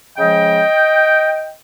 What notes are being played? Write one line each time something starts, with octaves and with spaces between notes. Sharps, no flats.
C#3 F3 G#3 D#5 G5